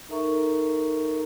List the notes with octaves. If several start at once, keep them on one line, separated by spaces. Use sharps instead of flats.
D#4 A4 A#4 E5 A#5 C#6